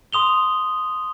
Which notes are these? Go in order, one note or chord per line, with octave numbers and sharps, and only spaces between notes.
C6 D#6 F7 G7